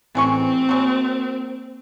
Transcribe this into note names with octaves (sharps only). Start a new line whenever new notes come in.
A1 E3 G#3 C4 C#6
F#3 G#3 A#3